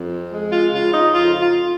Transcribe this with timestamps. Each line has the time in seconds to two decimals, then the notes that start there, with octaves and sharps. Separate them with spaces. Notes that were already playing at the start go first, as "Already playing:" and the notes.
Already playing: F2
0.32 G#3
0.52 F4
0.72 C#3 F4
0.92 D#4
1.13 F2 F4
1.42 F4